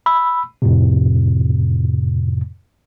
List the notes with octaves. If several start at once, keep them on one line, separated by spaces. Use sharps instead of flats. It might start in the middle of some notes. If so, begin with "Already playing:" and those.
B5 E6
F2 A2 C3